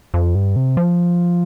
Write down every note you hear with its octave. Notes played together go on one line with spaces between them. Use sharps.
F2
G2
C3
F3